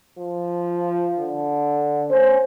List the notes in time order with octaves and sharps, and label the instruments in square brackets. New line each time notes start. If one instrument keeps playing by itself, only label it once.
[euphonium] F3
D3
[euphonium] C#4 [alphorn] C5